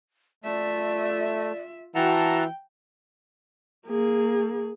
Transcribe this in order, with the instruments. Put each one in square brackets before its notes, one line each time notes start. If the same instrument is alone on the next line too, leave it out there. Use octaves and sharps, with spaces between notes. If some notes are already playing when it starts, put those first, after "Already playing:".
[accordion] A3 [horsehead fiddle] F4 E5 [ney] D5
[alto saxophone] E3 [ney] F#4 [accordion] F#5 A5 A#5 [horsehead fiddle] G5
[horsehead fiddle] A#3 G#4